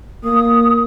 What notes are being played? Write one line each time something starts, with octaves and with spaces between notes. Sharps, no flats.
A#3 D#6